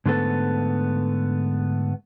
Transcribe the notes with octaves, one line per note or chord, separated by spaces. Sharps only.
G#2 D3 A3 B3 A4